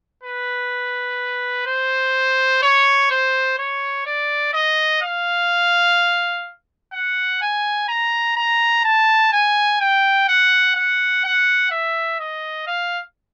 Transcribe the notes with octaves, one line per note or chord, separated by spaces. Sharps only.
B4
C5
C#5
C5
C#5
D5
D#5
F5
F#5
G#5
A#5
A#5
A5
G#5
G5
F#5
F#5
F#5
E5
D#5
F5